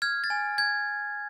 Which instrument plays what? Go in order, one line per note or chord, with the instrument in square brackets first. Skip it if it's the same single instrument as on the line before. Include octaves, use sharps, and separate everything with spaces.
[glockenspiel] F6 G#6
A6
G#5
G#6